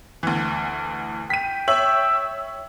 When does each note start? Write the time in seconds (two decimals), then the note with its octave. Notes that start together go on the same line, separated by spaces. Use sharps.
0.23 D2 E3
1.30 G5 B6 D#7
1.68 C#5 E5 E6 F#7